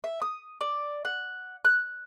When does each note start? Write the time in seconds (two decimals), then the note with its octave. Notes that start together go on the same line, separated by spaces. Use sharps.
0.04 E5
0.22 D#6
0.61 D5
1.05 F#5
1.65 F#6